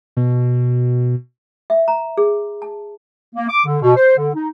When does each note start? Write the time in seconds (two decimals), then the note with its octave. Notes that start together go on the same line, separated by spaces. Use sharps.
0.17 B2
1.70 E5
1.88 A#5
2.18 G#4
2.62 A5
3.35 A#3
3.49 D6
3.65 D3
3.82 B2
3.96 C5
4.17 D3
4.34 D#4